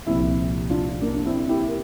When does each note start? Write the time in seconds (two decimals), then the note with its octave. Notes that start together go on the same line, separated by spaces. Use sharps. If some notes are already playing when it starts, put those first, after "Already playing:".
0.06 C2 A#2 F3 C4 E4
0.70 D4 F4
1.01 A#3 D4
1.14 D4
1.26 C4 E4
1.49 E4 G4
1.67 A#4